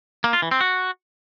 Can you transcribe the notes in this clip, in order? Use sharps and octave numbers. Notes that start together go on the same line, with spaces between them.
A#3
F4
E3
C4
F#4